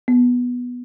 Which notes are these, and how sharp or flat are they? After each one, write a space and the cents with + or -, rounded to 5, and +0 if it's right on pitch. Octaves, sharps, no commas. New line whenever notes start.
B3 -5